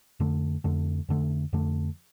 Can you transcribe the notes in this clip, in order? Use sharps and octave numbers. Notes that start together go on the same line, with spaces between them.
F2 D3 A3
F2 D3 A3
F2 D3 A3
F2 D3 A3